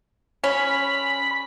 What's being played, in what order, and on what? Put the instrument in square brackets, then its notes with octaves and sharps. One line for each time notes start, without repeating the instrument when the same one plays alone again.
[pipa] C#4 [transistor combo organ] B5